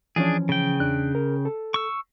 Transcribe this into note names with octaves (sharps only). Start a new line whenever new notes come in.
E3 F3 C#4 D4 G#4
C#3 G5
E2 D4 F#6
A#4
A4
C#6 E6